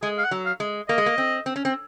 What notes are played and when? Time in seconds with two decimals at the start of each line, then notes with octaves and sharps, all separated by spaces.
0.02 G#3 G#4
0.18 F5
0.24 F#5
0.31 F#3
0.46 F5
0.60 G#3
0.88 A#3 D#5
0.98 G#3
1.06 A#3
1.18 C4
1.46 C4
1.56 C#4
1.65 C4